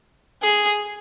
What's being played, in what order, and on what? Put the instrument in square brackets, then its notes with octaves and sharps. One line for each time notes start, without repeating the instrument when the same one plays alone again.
[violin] G#4